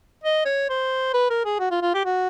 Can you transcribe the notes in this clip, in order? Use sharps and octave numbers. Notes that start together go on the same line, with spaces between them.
D#5
C#5
C5
B4
A#4
G#4
F#4
F4
F4
G4
F#4